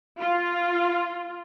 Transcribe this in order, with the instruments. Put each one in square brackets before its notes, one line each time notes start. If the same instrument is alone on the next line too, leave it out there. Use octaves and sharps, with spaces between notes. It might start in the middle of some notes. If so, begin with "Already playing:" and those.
[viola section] F4